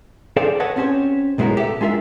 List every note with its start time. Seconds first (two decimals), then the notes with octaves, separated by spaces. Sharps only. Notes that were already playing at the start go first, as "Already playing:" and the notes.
0.37 G#4 A4 C5 D5 F5 G5
0.60 A4 B4 C#5 D#5 F#5 A5
0.76 C4 C#4 G4 C5 C#5
1.38 B1 A2 G#3 B3 F#4 A#4
1.57 G4 A4 B4 E5
1.81 G#3 D4 F4 A#4 E5